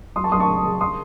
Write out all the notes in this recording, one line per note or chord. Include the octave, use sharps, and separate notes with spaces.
F#3 C6 D#6
A5 C#6
F#2 C6 D#6
A5 C#6
C#3
C#3
C6 D#6